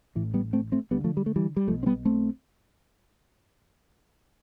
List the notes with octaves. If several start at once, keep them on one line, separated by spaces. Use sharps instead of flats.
A1 A2 E3
G3 B3
A3 C4
A3 C4
D2 D3 G3 B3
F3 A3
G3
A3
E3 G3
G3
B1 B2 F3 A3
C4
G3 B3
A3 C4